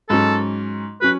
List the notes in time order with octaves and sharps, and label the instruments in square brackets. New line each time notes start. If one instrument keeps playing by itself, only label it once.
[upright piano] G#2 F#3 C#4 [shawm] A4
[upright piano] F#3 C#4 [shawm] B4